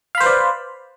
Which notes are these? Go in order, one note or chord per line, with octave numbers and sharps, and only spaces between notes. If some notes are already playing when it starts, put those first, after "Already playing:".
B4 C5 D5 F5 B5